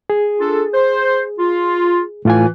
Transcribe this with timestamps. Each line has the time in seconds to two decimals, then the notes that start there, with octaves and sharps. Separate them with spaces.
0.10 G#4
0.40 D4 F4 A4
0.74 C5
1.39 F4
2.25 A2 E3 F4 G#5